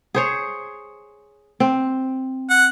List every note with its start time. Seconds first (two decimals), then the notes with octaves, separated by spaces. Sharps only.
0.15 G#4 C5 C#5
1.60 C4
2.50 F#5